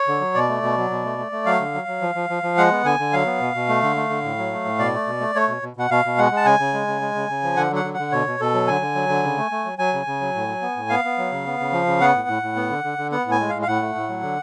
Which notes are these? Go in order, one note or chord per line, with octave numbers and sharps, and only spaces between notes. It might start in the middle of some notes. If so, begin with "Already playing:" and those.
Already playing: C#5
D3
F#3
B2 D5
A3
B2
F#3
B2
A3
A3
A3
F#3 F5
D3
F#3
F#3
F3
F3
F3
F3
G#3 F#5
B3
D3 G#5
D3
F#3 F5
B3
B2
B2
A3
D3
A3
D3
A2
F#3
A3
A2
B2 D5
A3
B2
A3
A3 C#5
B2
B2
B2 F#5
B2 F5
B2
G#3 F#5
G#3
A5
C#3 G#5
C#3
G#3
C#3
G#3
C#3
C#3
F3
D3 F#5
F#3
F#5
D3
F#5
D3
B2 C#5
B2
B2 A4
F#3
D3 G#5
D3
F#3
D3
C#3
A3
A3
F#3
F#3 G#5
C#3
C#3
F#3
A2
F#3
B3
A2
B3 F5
B3
F#3
C#3
B3
C#3
F3
C#3
B3 F#5
A2
A2
A2
B3
D3
D3
D3
B3 F#5
A2
G#5
G#3
F5
A2
F5
A2 F#5
A3
A2
F#3
D3